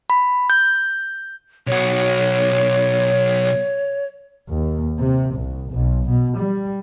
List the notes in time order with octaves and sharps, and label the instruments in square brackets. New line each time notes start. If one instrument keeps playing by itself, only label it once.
[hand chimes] B5
G6
[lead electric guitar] B1 F#4 [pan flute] C#5
[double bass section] D#2
C3
C2
B1
B2
G3